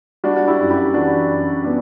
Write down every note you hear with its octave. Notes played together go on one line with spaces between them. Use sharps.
G3 D4 F#4
F#4
E4 G4
F#2
E4 G4
E3 D4 F#4
F#2
G3 B3 D4